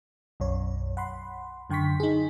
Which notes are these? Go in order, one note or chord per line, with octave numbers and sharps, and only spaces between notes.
B1 F#2 C#5
F#5 B5 C6
F#2 D3 G5 C6 C#6 B6
D#4 G#4